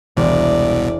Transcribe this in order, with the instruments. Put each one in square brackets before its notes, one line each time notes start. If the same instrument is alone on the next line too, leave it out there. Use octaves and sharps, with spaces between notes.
[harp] E1 [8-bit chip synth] C2 B2 [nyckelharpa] D5